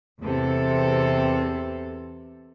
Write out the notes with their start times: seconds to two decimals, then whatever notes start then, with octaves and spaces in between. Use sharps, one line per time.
0.21 E2 C3 A4